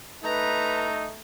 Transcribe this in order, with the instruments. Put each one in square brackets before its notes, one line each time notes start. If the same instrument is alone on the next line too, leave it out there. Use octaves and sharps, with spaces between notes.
[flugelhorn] A3 [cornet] D#4 [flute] B4 [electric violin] A#5